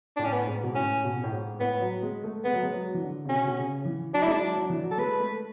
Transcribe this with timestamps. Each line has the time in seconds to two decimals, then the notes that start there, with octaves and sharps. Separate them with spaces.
0.17 A2 D4
0.25 C#4
0.33 B3
0.47 G#2
0.63 B2
0.75 A2 C#4
1.04 B2
1.16 B2
1.24 A2
1.32 G#2
1.60 A2 B3
1.81 F#3
2.02 G#3
2.24 A3
2.44 G#3 B3
2.53 F#3
2.63 G#3
2.73 F#3
2.94 E3
3.01 D3
3.25 C#3
3.29 B2 C#4
3.47 B2
3.57 C#3
3.85 E3
4.13 F#3 D4
4.22 E4
4.27 G#3 D4
4.39 F#3
4.56 F#3
4.70 E3
4.83 F#3
4.91 A4
4.98 G#3 B4
5.20 A3